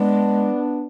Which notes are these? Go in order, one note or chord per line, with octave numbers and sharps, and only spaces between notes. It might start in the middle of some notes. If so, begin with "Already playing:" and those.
Already playing: G#3 B3 D4